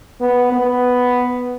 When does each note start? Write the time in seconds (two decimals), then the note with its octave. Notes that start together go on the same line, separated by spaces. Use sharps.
0.20 B3
0.52 B3